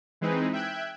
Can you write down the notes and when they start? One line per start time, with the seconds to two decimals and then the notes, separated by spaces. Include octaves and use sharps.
0.21 E3 G#3 C4 D#4 G#4 B4
0.53 E5 G5 F#6 G#6